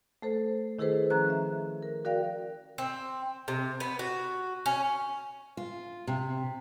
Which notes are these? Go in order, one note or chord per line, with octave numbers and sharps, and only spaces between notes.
A3 A4 C5
D#3 E4 G#4 A4 B4 C5
F3 C#4 A#5 F#6
E5
A#4
F#4 A#4 D5 F5 G5
C4
C3
B3
F#4
C#4
F4
C3